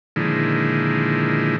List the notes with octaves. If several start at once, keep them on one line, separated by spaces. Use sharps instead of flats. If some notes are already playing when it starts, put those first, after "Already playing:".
A#2 D3 D#3 F3 G#3 E4